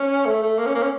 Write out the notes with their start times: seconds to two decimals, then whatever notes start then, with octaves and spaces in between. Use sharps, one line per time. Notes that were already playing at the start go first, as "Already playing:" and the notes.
Already playing: C#4
0.25 A3
0.42 A3
0.58 A#3
0.66 C#4
0.75 A#3
0.83 C#4